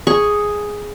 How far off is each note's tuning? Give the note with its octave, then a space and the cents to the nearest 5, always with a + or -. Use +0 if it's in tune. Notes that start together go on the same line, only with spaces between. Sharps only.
G#4 +0 C#6 -5